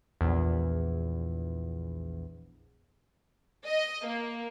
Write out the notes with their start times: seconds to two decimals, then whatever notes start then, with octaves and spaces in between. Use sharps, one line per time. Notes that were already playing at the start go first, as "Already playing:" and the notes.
0.21 A#1 E2
3.67 D#5
4.06 A#3